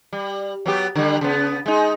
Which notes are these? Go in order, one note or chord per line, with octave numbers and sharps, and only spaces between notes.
G3
F#3 B3 G4
D3 G3
C#3 B3
G#3 D#4